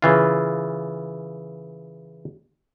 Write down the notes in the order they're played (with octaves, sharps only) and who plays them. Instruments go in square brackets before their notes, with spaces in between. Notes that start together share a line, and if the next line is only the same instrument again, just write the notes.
[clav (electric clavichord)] C#3 E3 F4